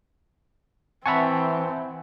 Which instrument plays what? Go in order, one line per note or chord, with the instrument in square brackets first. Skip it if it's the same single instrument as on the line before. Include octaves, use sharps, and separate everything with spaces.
[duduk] E3 [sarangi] C4 [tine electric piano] E5 F#5 C#6 [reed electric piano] G#5 A5 B5